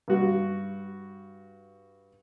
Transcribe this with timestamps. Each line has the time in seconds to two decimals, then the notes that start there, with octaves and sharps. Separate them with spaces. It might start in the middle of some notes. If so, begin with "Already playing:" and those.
0.08 G2 F#4